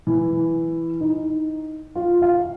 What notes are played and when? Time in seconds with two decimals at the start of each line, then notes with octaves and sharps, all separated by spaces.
0.07 E3
1.01 D#4
1.96 F4
2.22 F5